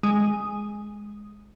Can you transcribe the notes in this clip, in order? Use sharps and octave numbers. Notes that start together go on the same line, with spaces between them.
G#3